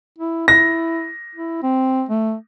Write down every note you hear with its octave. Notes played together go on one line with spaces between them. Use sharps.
E4
E4 A#6
E4
C4
A3